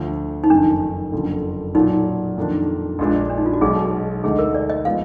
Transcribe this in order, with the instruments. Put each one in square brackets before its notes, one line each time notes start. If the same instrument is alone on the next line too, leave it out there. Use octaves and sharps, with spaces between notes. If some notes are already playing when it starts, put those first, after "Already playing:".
Already playing: [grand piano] D2 D3 F3
[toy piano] D#4
[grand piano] F#1 F2 D#3 [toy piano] D4
[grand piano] F#1 F2 D3
[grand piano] B1 A#2 F#3 [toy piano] D#4
[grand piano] F2 D#3 A#3 D4
A#1 A#2 G#3 D4
[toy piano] D4
D#4
F4
F#4
[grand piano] B1 B2 G#3 [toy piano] G#4
[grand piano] D2 D3 G#3 D#4 [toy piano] G#4
[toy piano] A#4
D5
D#5
[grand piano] F3 G#3 B3 [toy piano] F5